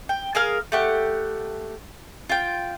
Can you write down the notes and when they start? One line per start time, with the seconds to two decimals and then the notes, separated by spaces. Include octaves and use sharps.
0.09 G5
0.35 G#4 A#4 F5 F6
0.72 A3 G4 F#5
2.29 F4 G5